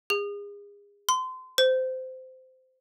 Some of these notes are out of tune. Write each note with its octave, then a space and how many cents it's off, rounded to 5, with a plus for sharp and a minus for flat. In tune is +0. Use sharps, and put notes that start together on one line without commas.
G#4 -35
C6 -30
C5 -20